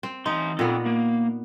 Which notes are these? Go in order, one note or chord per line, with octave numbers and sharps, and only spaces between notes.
C4
E3 D#4 C6
A#2 B3 C4 A4
A#3